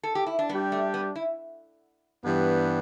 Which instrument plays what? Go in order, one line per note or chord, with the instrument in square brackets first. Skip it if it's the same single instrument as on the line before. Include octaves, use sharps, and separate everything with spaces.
[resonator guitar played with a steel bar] A4
G4
E4
D4
[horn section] G3 [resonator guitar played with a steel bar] B3
[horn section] D4 G4
[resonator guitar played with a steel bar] A3
B3
E4
[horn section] G2 E3 G3 B3